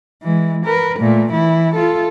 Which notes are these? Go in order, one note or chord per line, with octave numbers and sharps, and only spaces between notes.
E3 G#3
A#4 B4
A#2 A3
E3 E4
F4 A4